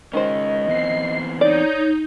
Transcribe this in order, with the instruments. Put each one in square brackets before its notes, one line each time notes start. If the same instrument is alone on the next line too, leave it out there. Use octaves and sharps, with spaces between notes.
[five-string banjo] D#3 C5 [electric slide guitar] G#3 C#4 [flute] D#5
[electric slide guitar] E3 B3 C4 [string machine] C7
[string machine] D#4 G6 [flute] C#5 [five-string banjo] D5